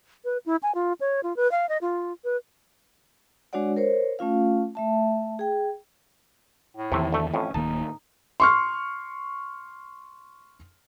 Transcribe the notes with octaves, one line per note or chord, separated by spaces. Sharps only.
B4
E4
G#5
F4
C#5
F4
B4
F5
D#5
F4
B4
G#3 D4 F#4 C#5 D5 F#5
A#4 C5 C#5
A3 C#4 F4 F5
A3 E5 A5
G#4 G5
A2
E2 C3 D#3 E3 A3
D2 A3
F2 A2 C#4
D1 D#3 A#3 D#4 A5
C6 C#6 F6